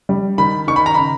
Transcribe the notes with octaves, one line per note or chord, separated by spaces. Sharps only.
G3
D#3 B5
D#3 C#6
B5
A#5
C#3 B5